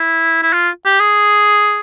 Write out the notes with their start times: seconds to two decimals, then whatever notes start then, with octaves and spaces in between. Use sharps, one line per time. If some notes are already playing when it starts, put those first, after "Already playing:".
Already playing: E4
0.43 E4
0.53 F4
0.85 G4
1.00 G#4